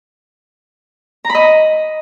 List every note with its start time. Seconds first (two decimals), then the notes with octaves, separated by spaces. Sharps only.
1.25 A#5
1.30 B5
1.35 D#5